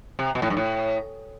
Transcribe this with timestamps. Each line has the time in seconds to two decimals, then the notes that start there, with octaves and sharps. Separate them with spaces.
0.19 C3
0.35 B2
0.42 A2
0.50 G2
0.57 A2